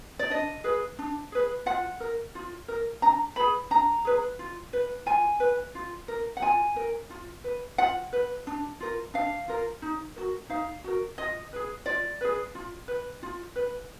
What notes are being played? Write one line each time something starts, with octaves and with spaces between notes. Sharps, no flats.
D5
D4 D#5
G#4 B4
D4
G#4 B4
F4 F#5
A#4
F4
A#4
D4 A#5
G#4 B4 B5
D4 A#5
G#4 B4
F4
B4
F4 G#5
B4
F4
A#4
F#5
F4 G#5
A#4
F4
B4
F4 F#5
B4
D4
F4 A#4
D4 F5
F4 A#4
D#4
F#4 A#4
D#4 F5
F#4 A#4
F4 D#5
G#4 B4
F4 D5
G#4 B4
F4
B4
F4
B4